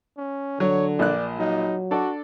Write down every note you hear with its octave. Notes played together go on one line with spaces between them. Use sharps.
C#4
D3 F#3 C#5
A#1 A#2 D5 F#6
F#3 D#4
D4 F#4 A4 D5